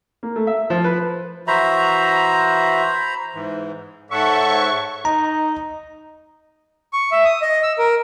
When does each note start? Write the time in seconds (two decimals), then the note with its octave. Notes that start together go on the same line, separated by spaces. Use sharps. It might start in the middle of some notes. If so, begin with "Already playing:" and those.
0.23 A#3
0.36 A3
0.47 E5
0.70 F3
0.84 B4
1.47 E3 F#4 C5 E5 A#5 B5
3.35 G#2 E3
4.11 G#2 A4 C#5 E5 F#5 C#6
5.05 D#4 A#5
6.93 C#6
7.12 E5
7.25 D#6
7.42 D#5
7.63 E6
7.78 A#4